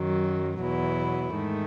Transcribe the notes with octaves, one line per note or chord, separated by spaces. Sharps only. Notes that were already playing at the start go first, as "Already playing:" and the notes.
Already playing: F#2 D#3 F#3
E2 B2 F#3 B3 E4
G#2 D#3 A3